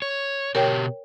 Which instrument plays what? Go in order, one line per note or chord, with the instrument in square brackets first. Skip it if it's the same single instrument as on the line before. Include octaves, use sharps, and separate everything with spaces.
[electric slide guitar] C#5
[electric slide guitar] B2 G4 [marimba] A#4 C#5 G5